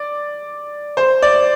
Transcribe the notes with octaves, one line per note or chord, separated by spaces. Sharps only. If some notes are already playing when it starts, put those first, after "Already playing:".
Already playing: D5
C5
D5